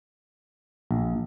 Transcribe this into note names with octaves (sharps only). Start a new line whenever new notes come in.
A#1